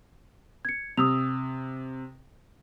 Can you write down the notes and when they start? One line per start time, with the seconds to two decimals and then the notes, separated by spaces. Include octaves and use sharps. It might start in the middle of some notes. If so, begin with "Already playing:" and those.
0.65 G#6 C#7
0.97 C3 D#6 E6 F7